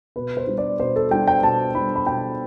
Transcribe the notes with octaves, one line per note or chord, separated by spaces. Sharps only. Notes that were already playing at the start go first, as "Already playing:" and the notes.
B2 B4
C5
G3 D4
D5
B2 C5
A4
G3 D4 G5
G5
B2 A5
G3 D4 B5
B5
B2 G5